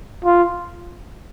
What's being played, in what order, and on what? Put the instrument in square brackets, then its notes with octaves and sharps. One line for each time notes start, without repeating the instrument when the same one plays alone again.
[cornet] F4